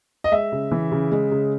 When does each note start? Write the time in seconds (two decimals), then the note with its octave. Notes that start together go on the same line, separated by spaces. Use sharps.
0.24 D#5
0.31 G#3 E5
0.52 C#3
0.71 E3
0.92 C#3
1.11 G#3
1.31 C#3